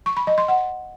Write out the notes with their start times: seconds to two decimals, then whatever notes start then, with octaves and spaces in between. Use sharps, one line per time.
0.06 C#6
0.17 B5
0.27 D#5
0.38 C6
0.48 F#5